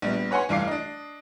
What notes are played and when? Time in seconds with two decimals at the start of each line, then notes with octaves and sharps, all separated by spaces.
0.02 A#1 G3 B3
0.31 B4 C#5 F#5 G#5 C6
0.49 F1 G2 E3 F5 D6 C7
0.68 D4 D#5